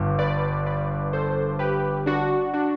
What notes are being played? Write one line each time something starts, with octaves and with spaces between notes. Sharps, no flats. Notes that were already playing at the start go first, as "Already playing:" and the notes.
Already playing: G1 G2
B4 D5
B4 D5
A4 C5
G4 B4
D4 F#4
D4 F#4